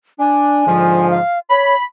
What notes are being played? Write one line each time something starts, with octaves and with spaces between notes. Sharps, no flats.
D4 G#5
G#2 D3 F3
F5
C#5 B5